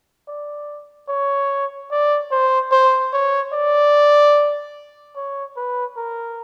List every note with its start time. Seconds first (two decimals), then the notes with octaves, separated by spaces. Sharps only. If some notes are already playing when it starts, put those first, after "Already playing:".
0.28 D5
1.08 C#5
1.91 D5
2.31 C5
2.71 C5
3.13 C#5
3.53 D5
5.16 C#5
5.57 B4
5.97 A#4